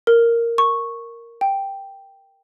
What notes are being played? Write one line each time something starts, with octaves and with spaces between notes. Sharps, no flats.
A#4
C#6
G5